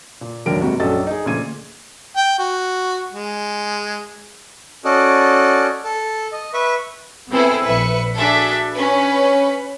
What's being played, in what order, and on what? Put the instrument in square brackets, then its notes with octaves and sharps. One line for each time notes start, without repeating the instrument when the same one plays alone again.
[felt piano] A#2
E1 D#2 F#3 D4 A#4 D7
F1 G#2 C3 F#4
A#1 F#2 F#3 A4 D#5 A6
D#4 G#4
D2 A#2 C#3 F3 G#6 D#7
[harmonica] G5
F#4
G#3
[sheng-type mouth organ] C#4 F#4 A4 D5 D#5
A4
D#5
B4 E5 C#6
[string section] B3 C4 E4 G#4 A4
A#1 B4 E5 C#7
D4 F#4 G#4 A4 E5
C#4 B4